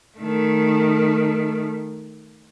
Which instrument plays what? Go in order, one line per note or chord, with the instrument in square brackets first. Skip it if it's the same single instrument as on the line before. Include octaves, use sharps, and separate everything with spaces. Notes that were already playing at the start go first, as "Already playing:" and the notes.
[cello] D#3 A3